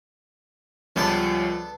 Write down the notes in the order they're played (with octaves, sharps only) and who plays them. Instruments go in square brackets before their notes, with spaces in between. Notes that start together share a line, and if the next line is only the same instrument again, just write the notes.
[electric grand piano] C#2 G3 C#4 [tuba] F3 [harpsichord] B3 D4 A4